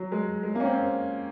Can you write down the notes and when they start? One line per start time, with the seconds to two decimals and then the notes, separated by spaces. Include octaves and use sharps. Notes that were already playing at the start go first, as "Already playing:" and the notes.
Already playing: F#3
0.12 G#3
0.43 G#3
0.55 A#3
0.60 C#4
0.65 C4